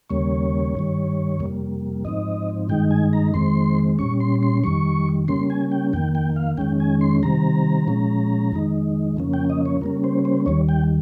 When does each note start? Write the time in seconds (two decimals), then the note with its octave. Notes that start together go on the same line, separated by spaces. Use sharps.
0.10 D#2 C#3 G3 A#3 C#5
0.75 G2 D#3 G3
1.40 F2 C3 G3 A#3
2.05 G#2 F3 C4 D#4 D#5
2.69 G2 D#3 G#3 D#4 G5
2.91 G#5
3.13 A#5
3.34 F2 D#3 G#3 C4 C6
3.99 A#2 G3 C#4 C#6
4.20 C6
4.43 C6
4.64 F2 D#3 G3 C#6
5.28 C#3 G3 A#3 C#4 C6
5.50 G#5
5.72 G5
5.93 F2 D#3 A#3 G5
6.15 G5
6.36 F5
6.57 F2 D#3 G#3 C#4 G5
6.80 G#5
7.01 C6
7.23 C3 D#3 G3 C4 A#5
7.88 A#2 F3 G#3 C#4
8.52 F2 D#3 G#3 D#4
9.17 F2 C#3 F3 A#3 C#4
9.34 G5
9.50 D#5
9.66 C#5
9.81 C#3 G3 A#3 C#4 A#4
10.04 C5
10.25 C5
10.46 D#2 D#3 G3 C#5
10.69 G5